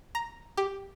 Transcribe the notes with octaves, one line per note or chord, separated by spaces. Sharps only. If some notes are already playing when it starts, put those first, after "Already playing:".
A#5
G4